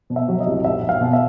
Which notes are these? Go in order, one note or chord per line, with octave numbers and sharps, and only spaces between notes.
B2
E5
F#3
D#5
C2
B1 E5
B1
F5
B2
E5